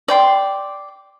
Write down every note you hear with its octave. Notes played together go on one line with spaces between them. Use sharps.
D5 G5 C6